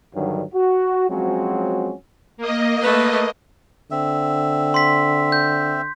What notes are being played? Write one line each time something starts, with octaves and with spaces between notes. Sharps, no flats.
G2 D3 D#3 F#3
F#4
F3 F#3 G#3 C4 C#4 F#4
A#3 D#5
A3 B4
D3 C4 E5
C6 B6
G6